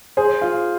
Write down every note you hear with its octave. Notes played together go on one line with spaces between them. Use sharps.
G#4 C5
F4